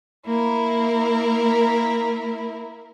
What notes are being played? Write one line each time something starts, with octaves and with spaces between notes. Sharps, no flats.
A#3 E4 A#4